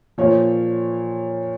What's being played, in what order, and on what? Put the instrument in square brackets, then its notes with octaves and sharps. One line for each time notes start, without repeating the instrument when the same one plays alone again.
[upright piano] A#2 F3 C#5